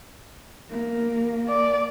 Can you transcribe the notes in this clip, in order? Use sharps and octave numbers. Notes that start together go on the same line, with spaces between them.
A#3
D5